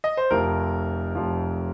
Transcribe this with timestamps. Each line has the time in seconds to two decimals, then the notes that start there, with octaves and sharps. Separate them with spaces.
0.04 D#5
0.17 C5
0.31 F1 F2 F3 A#4
1.15 F1 F2 F3